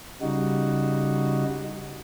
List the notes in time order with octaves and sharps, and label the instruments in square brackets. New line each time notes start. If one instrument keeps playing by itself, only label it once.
[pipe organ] C#3 G3 D#4 F#4